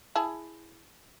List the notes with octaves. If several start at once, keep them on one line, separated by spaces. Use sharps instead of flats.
E4 G#4 A5